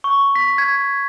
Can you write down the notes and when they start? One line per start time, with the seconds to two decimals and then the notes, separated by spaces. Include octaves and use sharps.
0.04 C#6
0.35 B6
0.58 G#6